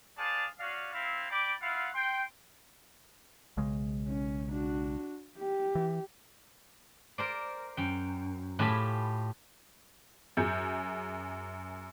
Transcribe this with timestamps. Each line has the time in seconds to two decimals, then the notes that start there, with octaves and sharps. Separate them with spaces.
0.18 D4 G#4 C5 D5 F5 A5
0.60 C#4 F#4 D5 F5
0.93 C4 E4 F5
1.30 D5 G5 B5 D6
1.62 G#3 E4 F4 F5 F#5
1.95 G5 C6
3.57 B1 C#3 G#3
4.08 C#4
4.52 D4 F#4
5.38 G4
5.75 E3
7.18 A#4 C5 D5
7.77 F#2 G5
8.59 A2 F4 G4 G#5 A5 B5
10.37 F#2 G#4 G6 C#7